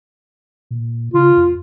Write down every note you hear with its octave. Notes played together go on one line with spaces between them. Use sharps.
A#2
C#3 F4
F2